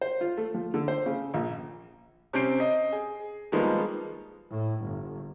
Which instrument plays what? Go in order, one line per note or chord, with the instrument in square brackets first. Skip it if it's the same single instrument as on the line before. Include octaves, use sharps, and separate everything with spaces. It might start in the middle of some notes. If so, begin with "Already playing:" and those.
[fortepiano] C5
F4
A3
F3
D3
C5
C#3
A#1
[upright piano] C3 C4 C#4 G6 C7 D7
D#5
G#4
D#3 F3 G3 G#3 A#3 B3
[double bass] A2
G1